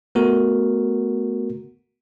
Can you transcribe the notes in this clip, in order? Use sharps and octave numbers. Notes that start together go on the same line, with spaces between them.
A3 B3 F#4 A#4